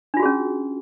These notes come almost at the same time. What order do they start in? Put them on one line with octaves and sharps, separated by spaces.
D4 F4 F#4 G#4 C#4